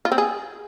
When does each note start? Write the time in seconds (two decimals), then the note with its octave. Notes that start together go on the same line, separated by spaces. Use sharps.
0.05 F4
0.12 C4
0.18 G#4